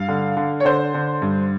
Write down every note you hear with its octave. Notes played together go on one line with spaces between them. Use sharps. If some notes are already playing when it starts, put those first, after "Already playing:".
Already playing: G2 F5
D3
D3
C#5
D3 C5
D3
G2